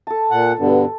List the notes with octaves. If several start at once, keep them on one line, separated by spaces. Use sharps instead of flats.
A4 A5
A#2 F#5
G2 B2 D3